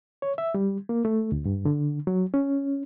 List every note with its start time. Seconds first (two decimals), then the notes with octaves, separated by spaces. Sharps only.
0.22 C#5
0.38 E5
0.54 G3
0.89 A#3
1.05 A3
1.32 D2
1.45 G2
1.65 D3
2.07 F#3
2.34 C#4